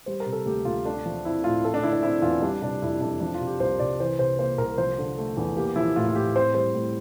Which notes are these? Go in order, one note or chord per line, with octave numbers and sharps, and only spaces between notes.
G3 C5
A#4
C3
A4
D2 G4
D2 F4
A3 D4
F3
C4 E4
A2 F4
A3 A4
D4
D3 E4
D4
C4 E4
E2 F4
G3 D4
C3 D4
F2 E4
F2 D4
F3 D4
F4
C3
G4
C2 C5
C2 D5
E3 C5
C3 C5
A#3 C5
C2 A#4
F3 C5
D3
A3
E2
A#3 G4
F3 E4
A2 F4
F4
A2 G4
C4 C5
G3 C5
A2